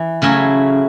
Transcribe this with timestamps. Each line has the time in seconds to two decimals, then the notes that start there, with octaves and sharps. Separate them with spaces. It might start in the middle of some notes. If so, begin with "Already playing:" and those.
Already playing: E3
0.22 C#3 F#3 A3 C#4 E4